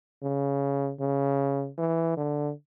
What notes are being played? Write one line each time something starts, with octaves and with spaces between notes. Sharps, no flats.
C#3
C#3
E3
D3